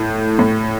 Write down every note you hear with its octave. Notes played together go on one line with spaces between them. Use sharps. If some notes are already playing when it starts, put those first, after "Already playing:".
Already playing: A2
A2